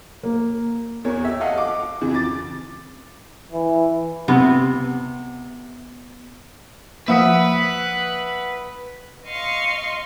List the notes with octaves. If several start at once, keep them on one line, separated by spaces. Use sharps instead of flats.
A#3
E2 A#4 C#5
G4 E5
A4 D#5 F5 F#5
D6
F2 C#3 E3
D6 A6
E3
C3 B3
F3 A#3 B4 E5 F#5 D#6
D#5 F5 C6 C#6